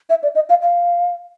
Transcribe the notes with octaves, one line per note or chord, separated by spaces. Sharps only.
E5
D5
D#5
F5
F5